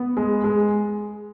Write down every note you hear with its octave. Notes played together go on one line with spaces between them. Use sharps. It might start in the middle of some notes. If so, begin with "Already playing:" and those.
Already playing: B3
G#3
G#3